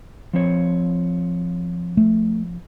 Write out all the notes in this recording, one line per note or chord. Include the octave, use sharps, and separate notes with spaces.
F3 C4 C#5
A3